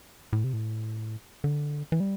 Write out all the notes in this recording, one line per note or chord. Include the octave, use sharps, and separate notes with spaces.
A2
C3
A2
D3
E3
G3